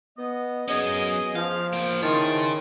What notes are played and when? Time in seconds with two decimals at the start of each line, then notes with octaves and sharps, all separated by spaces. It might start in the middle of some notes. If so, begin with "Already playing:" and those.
0.18 B3 D#5
0.68 F#3 B3 C#4 G#4 D#5
1.35 F3 F5
1.73 A#3 C5
2.02 D#3 E4 G#4 C#5 A5 C6